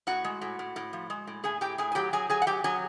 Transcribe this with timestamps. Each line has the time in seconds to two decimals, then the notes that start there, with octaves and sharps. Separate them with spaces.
0.07 A2 F#4 F#5
0.24 G#3
0.41 A2
0.59 A2
0.76 A2
0.93 F3
1.10 G#3
1.27 A2
1.44 A2 G#4 G#5
1.61 A2 G4 G5
1.78 A2 G#4 G#5
1.92 G#5
1.95 F#3 G4 G5
2.13 F#3 G#4 G#5
2.30 F#3 G#4 G#5
2.42 F#5
2.47 F#3 G4 G5
2.64 F#3 G#4 G#5